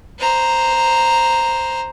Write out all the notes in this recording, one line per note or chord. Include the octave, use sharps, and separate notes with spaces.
C5 A#5